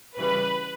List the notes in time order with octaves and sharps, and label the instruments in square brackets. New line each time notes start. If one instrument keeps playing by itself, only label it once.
[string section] C#3 E3 G3 B4